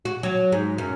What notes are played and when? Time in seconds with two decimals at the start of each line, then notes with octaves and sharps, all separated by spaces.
0.05 F#4
0.23 F#3
0.52 G#2
0.78 F#2